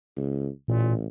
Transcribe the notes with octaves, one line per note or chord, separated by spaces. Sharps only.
C#2
A1 A#2